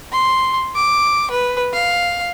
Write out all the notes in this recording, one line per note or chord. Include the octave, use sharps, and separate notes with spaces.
C6
D6
B4
F5